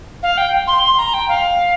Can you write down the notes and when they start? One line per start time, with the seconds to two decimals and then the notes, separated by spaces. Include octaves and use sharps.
0.23 F5
0.37 G5
0.67 C6
0.83 C6
0.99 A#5
1.14 G5
1.29 F5